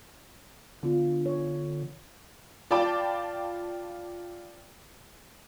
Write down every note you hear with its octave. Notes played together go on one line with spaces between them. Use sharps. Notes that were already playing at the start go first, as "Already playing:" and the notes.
D3 B3 F4
C#5
F4 D5 G5 A5 B5 D6